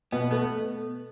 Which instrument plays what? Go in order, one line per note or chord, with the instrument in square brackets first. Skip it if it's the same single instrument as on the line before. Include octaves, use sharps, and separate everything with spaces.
[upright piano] B2 [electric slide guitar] B3
[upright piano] A3 [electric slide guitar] B3